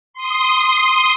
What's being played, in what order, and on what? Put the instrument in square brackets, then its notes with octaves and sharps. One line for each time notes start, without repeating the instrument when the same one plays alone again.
[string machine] C6 D#6